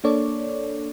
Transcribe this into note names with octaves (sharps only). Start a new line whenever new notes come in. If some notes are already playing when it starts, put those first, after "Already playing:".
A#3 D4 A4 C#5 D5